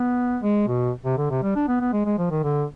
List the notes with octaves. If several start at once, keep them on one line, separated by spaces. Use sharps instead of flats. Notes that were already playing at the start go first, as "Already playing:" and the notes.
Already playing: B3
G#3
B2
C3
D3
C3
G3
D4
B3
B3
G#3
G#3
F3
D#3
D3